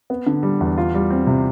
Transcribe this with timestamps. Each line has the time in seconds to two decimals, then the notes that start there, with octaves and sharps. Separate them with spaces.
0.10 B3
0.26 D3
0.43 G3
0.61 E2
0.78 F4
0.95 G3
1.11 C4
1.27 C3